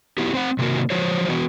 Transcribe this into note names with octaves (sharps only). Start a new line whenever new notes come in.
B3 E4 F#4 G4
C4 C5 F#5
C3 D#3 A#3 F#4 A#4
F3 F#3 F#4 C5 C#5
E3 B3 F#4 B4